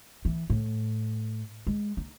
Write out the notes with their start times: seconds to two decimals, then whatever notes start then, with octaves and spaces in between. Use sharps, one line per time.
0.25 E3
0.50 A2
1.67 G#3
1.97 D#4